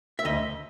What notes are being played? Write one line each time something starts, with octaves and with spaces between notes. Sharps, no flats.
E5
D2 D#5